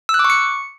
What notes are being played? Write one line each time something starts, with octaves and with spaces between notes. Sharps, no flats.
E6
F#6
D6
C#6
C#7